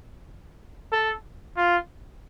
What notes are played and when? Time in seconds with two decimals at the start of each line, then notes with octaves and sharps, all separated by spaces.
0.92 A4
1.57 F4